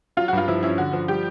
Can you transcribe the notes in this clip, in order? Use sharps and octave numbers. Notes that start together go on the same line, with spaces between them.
F#3 F4
F#4
G2 F4
F3 E4
C#4 E4
D3 F#4
F3
G3 G4